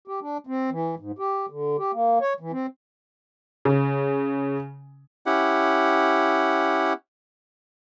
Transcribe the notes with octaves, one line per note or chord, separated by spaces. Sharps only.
G4
D4
C4
E3
G#2
G4
D3
G4
A#3
C#5
E3
C4
C#3
C#4 E4 G4 F#5